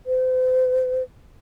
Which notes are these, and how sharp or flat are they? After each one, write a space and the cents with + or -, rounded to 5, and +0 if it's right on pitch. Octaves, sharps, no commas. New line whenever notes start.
C5 -40